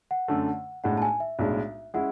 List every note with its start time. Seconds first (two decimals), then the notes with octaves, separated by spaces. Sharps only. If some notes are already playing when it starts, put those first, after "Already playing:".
0.11 F#5
0.28 F#2 D3 A3
0.84 B1 A2 G#3 D4 F#5
0.98 A5
1.02 G#5
1.20 E5
1.39 B1 A2 G#3 D4
1.94 G#3 C#4 E4 F#5